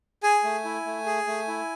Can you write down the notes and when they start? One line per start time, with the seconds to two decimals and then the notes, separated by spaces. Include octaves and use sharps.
0.23 G#4 G#5
0.44 A3
0.65 E4
0.86 A3
1.06 G#4
1.27 A3
1.48 E4